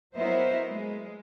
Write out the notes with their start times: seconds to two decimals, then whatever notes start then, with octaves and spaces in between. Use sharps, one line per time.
0.16 F#3 B3 E4 A#4 C5 D#5
0.71 G#3